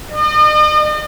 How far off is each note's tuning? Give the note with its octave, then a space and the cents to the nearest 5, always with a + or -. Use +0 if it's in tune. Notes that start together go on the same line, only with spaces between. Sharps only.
D#5 -45